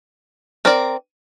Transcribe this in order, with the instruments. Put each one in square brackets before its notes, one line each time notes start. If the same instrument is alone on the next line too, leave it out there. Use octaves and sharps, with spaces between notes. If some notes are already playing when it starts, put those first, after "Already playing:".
[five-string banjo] C4 A#4 D5